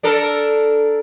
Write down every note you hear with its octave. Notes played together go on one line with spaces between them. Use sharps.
D4 A4 A#4